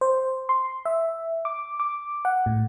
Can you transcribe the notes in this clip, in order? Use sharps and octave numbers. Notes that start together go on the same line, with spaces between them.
C5
C6
E5
D6
D6
F#5
A2